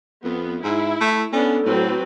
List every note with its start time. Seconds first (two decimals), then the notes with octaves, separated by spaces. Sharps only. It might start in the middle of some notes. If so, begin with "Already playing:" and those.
0.24 F2 B3
0.63 G#2 E4
1.01 A3
1.33 B3 C#4 D4 A4
1.66 A2 F#3 C4 B4